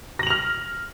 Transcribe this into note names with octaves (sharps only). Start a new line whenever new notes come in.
F6 A#6 F7 F#7